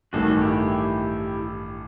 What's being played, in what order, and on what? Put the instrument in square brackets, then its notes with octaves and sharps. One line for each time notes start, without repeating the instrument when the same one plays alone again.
[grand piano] A1 G2 D#3 A3 [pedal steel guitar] F#4 A4
[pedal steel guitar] E4 G4